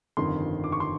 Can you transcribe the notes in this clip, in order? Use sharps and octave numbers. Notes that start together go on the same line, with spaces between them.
G1 F2 C3 D#3 C6
D6
C#6
C6